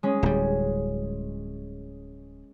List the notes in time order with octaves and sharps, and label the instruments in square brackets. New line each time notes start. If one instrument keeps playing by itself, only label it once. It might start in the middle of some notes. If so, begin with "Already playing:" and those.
[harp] G#3 C#4
[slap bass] D1 G3